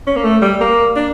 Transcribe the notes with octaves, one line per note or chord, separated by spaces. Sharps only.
C#4
A#3
A3
G3
A#3
D4